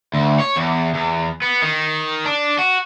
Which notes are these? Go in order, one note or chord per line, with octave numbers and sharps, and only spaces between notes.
D2
C#5
E2
E2
B3
D#3
D4
F#4